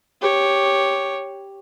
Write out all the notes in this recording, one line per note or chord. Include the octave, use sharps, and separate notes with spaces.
G4 C#5